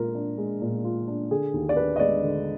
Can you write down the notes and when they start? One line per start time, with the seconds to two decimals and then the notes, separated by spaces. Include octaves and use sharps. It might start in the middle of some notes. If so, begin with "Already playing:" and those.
Already playing: A#2 G#3 F4 A#4
0.15 D4
0.38 G#3
0.62 A#2
0.84 F4
1.08 D4
1.31 D3 G#4
1.54 D#2
1.69 D5
1.76 D4 B4
1.96 D#5
2.00 G#3 D5
2.23 D3